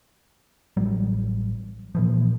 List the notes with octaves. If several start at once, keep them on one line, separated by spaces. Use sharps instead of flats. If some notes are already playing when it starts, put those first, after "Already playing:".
A1 F#3 G3
A#2 E3 F3